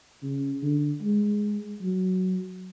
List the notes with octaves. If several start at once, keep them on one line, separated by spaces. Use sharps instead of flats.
C#3
D3
G#3
F#3